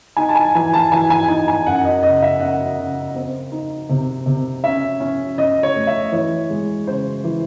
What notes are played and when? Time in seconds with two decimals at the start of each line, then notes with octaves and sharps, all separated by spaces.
0.17 D#4 G#5
0.29 A5
0.35 G#5
0.55 E3 G#5
0.74 A5
0.92 E3 G#5
1.10 G#5
1.28 D#4 G#5
1.48 G#5
1.67 F#2 F#5
1.85 D#5
2.03 C#3 D#5
2.22 E5
2.40 C#4 F#5
2.78 C#3
3.15 C4
3.52 D#4
3.90 C3
4.26 C3
4.64 C#4 E5
5.00 C#4
5.38 C#4 D#5
5.63 C#5
5.76 A3
5.87 E5
6.12 E3 C#5
6.50 G#3
6.87 C#3 C5
7.24 E3